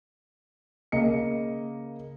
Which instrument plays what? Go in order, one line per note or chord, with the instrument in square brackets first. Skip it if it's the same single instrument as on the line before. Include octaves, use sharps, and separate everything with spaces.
[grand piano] C#3 A#3 D#5 C#7